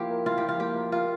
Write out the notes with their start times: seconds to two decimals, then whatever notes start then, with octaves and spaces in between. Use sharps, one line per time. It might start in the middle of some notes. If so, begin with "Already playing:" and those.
Already playing: F3 A#3 E4 F4 G4
0.10 A#4
0.26 E4 F4
0.38 F3 G4
0.49 F4
0.59 A#3 G4
0.76 A#4
0.92 F4 A#4